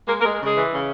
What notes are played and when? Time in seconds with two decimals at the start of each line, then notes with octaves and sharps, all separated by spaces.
0.08 G#3 A#3 A#4
0.20 A#3 A#4
0.24 G#3
0.40 C#3 G#3 G#4
0.56 E3
0.72 C#3